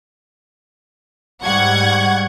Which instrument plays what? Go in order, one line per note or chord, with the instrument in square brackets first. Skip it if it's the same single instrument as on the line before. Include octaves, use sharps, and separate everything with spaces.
[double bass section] G#2 G3 [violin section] F#5 C#6 G#6